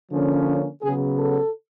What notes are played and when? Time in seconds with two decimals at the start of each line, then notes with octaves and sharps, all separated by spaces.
0.12 D3 F3 A#3 C#4
0.83 C#3 F#3 B3 G#4
1.18 A4